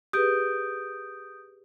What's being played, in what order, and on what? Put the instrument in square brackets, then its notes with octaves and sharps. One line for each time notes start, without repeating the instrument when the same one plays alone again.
[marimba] G4 G#4 B4 [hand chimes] D#6 G6 D7